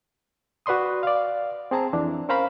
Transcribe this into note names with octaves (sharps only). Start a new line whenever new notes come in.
F#4 B4 D5 C6 D#6
D5 F5
C4 G#4 A5 A#5
F2 E3 D4
C#4 A#4 C5 F5 A#5 B5